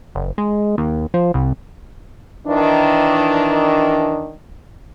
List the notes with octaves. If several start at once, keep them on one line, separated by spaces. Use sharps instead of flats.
F#1
G#3
D#2
F3
C2
D#3 E3 D4